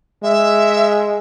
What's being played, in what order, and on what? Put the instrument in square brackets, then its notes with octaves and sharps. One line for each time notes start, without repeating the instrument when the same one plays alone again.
[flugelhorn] G#3 [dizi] E5